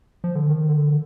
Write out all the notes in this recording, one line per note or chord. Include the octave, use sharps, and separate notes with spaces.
F3
D3
D#3
D3